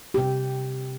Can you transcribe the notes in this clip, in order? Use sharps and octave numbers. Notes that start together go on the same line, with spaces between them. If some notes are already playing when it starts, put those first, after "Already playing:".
C3 G4